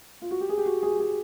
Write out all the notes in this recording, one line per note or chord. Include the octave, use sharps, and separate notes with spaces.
F4
F#4
G4
G#4
G4
F#4
G#4
G#4